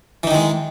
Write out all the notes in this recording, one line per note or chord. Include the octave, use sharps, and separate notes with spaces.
D#3 E3 G#3 D#4